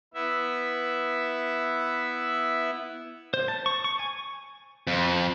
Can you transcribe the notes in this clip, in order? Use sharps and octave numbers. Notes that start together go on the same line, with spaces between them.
B3 E4 E5
C5
A5
C#6
C#6
G#5
F2